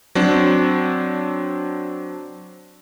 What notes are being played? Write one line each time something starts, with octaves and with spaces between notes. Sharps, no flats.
F#3 C4 D4